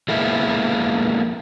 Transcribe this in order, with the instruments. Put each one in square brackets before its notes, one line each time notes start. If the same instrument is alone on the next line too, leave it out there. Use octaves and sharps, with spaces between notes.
[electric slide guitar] F3 G#3 A#3 B3 E4